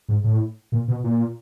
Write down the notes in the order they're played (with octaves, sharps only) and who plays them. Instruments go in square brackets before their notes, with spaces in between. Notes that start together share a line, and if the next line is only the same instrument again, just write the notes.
[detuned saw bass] G#2
A2
A#2
B2
A#2